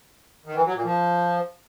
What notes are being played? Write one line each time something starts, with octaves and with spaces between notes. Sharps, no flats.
D#3
E3
F#3
A#2
F3